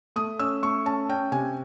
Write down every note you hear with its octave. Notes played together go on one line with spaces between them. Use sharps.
A3 D#6
C#4 E6
A3 C#6
C#4 A5
C#4 G5
C3 G#5